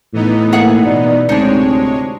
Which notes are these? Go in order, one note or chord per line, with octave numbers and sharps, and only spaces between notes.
A2 E3 B3 D#4
A#3 G#4 E5 F#5
B2 D5
D2 A2 C3 G#3 C4 D4 D#4 C#5